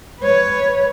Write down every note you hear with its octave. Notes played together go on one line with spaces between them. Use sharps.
B4 C#5